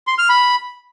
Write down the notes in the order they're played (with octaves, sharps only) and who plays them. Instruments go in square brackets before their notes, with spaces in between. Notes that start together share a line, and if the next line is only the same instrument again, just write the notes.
[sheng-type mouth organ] C6
F6
B5